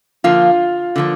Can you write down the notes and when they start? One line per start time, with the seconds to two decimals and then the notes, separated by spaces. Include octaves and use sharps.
0.24 D3 F3 A#3 F4
0.96 D3 F3 A#3